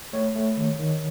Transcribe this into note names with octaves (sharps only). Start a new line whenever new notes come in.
A3 C#5
A3
D#3
D#3